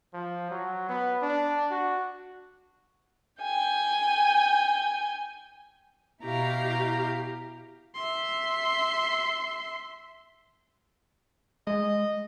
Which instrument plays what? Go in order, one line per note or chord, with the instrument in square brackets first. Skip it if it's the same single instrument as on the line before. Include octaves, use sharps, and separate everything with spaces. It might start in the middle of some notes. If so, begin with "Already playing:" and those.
[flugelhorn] F3
F#3
B3
D4
F#4
[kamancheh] G5 G#5
[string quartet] B2 E4 G4 F5 A#5
[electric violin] E5 C6
[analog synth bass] G#3 [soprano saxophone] D#5